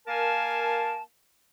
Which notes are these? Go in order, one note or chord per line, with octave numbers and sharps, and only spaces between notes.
A#3 A#4 F5 G#5 A5